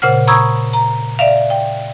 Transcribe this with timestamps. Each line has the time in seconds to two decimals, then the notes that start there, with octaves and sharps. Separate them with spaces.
0.02 A#2 C#3 C5 F#5 F6
0.27 A#5 B5 C#6 D#6 E6 G#6
0.73 A#5
1.19 D5 E5 F5
1.50 G5